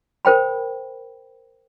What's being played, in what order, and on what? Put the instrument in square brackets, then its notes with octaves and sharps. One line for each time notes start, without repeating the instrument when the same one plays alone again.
[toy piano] A#4 C5 G5 B5